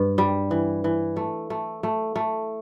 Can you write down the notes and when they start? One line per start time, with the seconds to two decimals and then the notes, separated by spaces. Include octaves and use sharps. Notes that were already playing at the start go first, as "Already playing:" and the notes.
Already playing: G2
0.18 G3
0.51 E3
0.84 E3
1.17 A3
1.50 A3
1.83 A3
2.16 A3